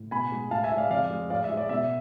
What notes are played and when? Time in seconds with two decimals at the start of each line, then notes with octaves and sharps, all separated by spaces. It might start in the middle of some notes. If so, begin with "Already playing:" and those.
Already playing: A2
0.11 B2 G#5 B5
0.32 G#3
0.51 A2 F5 A5
0.64 E5 G#5
0.72 G#3
0.77 D5 F5
0.90 F2 D5 F5
1.10 G#3
1.30 A2 D5 F5
1.44 E5
1.50 G#3
1.57 D5
1.69 B2 E5